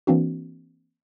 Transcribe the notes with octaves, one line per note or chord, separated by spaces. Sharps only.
E3 A#3 C4 D4 F#4